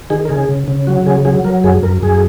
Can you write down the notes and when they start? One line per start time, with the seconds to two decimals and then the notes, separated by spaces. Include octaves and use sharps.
0.10 D#3 G#4
0.25 A#4
0.29 C#3 G#4
0.49 C#3
0.68 C#3
0.87 F#3 F#4
1.06 C#3 G#4
1.25 F#3 G#4
1.44 F#3 A#4
1.64 F#2 G#4
1.83 F#2 A#4
2.03 F#2 G#4